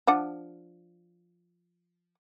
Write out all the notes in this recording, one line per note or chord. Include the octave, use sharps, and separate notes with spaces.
F3 D4 F#5